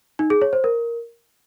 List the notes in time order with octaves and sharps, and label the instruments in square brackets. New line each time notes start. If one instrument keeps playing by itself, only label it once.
[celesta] D#4
G#4
C#5
C5
A#4